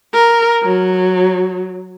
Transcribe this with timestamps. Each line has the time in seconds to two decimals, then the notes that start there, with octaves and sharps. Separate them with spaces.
0.13 A#4
0.63 F#3